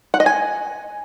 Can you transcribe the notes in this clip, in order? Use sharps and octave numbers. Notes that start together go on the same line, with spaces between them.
F#5
D#5
G#5